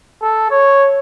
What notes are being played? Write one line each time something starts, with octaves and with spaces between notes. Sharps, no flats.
A4
C#5